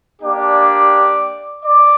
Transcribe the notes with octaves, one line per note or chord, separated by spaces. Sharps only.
A#3 D4 G4 D5 D6
D5 D6